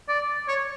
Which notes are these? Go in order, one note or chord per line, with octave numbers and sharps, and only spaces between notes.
D5
C#5